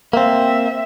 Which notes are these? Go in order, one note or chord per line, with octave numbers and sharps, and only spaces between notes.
A#3 C4 E5